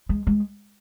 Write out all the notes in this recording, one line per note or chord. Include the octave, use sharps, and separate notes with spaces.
G#3
G#3